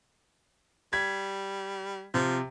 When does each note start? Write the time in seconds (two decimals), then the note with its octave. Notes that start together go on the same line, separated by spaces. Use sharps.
0.93 G3 G#6 B6
2.14 C3 F3